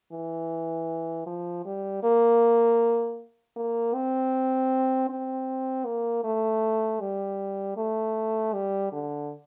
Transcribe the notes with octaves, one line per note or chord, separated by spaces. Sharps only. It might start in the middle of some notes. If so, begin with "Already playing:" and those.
E3
F3
G3
A#3
A#3
C4
C4
A#3
A3
G3
A3
G3
D3